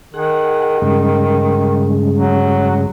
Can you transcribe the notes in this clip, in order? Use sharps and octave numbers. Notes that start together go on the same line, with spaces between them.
D#3 G#4 F#5
G2 C#3 G#3
F#3